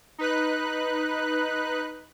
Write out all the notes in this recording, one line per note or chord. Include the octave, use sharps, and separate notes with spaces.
D#4 B4 F#6